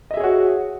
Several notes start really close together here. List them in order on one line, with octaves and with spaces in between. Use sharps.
D#5 E5 G#4 C#5 F#4